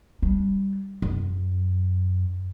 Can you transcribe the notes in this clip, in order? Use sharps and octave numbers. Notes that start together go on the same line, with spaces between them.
G3 D4
F#2